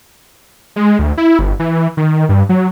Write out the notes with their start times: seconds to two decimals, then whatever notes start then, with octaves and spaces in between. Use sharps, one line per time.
0.76 G#3
0.99 D2
1.18 E4
1.39 G1
1.59 E3
1.97 D#3
2.29 G2
2.49 F#3